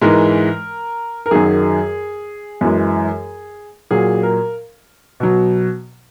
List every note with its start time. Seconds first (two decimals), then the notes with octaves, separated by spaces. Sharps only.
0.01 G#2 E3 G#3 A#4
1.26 A#4
1.31 F#2 D#3 F#3 G#4
2.61 F#2 E3 G#3
3.91 A#2 F#3 G#4
4.23 A#4
5.20 B2 F#3